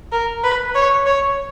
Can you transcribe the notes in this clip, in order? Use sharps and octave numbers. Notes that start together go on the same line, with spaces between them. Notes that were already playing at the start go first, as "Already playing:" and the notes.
A#4
B4
C#5
C#5